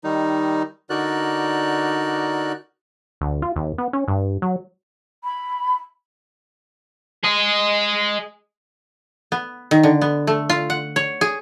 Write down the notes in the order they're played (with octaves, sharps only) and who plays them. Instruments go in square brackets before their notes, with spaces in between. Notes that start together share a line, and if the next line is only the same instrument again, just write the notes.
[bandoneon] D#3 G3 D#4
D3 D#4 F#4 A#4 D5 F#6
[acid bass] D2
F4
D#2
B3
C#4
G2
F#3
[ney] B5
[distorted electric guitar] G#4 D#5
[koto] B3
D#3
D3
B3
A3
F4
F#5
C#5
G#4